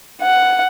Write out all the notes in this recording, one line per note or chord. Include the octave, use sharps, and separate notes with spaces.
F#5